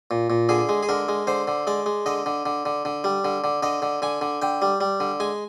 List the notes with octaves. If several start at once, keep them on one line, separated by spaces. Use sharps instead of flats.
A#2
A#2
D3 G#4
G#3
G#4
D3 A#4
G#3
D3 C5
D3
G#3 D5
G#3
D3 D#5
D3
D3
D3
D3
G3
D3
D3
D3 D#5
D3
D3 G#5
D3
D3 G5
G3
G3
D3
G#3 G#5